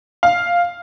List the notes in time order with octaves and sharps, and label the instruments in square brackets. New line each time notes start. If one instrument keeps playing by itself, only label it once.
[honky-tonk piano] F5